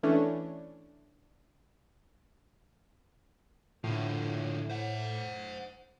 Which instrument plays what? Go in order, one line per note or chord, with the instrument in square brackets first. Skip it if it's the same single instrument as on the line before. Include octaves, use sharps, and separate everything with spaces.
[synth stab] E3 A3 C#4 D4
[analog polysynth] A2 [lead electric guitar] D3 F3
[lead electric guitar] C5 F#5